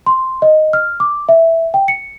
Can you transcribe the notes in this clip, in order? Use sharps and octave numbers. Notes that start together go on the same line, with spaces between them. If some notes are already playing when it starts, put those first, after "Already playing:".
C6
D#5
F6
D6
E5
G5
C#7